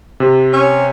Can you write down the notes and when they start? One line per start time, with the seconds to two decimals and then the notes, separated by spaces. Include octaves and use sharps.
0.20 C3
0.53 C#4